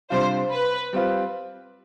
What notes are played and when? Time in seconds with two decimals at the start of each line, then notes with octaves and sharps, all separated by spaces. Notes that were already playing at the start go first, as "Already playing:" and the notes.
0.10 C3 G3 D4 F4 C5
0.51 B4
0.93 G3 C4 F4 B4